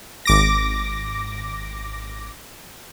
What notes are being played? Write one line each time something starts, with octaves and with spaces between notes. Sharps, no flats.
G#1 D6 A#6